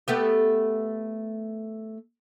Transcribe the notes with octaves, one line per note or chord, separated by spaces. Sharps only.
A3 B3 G4